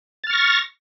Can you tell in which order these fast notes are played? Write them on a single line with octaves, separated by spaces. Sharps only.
A6 F6 C#6 A#6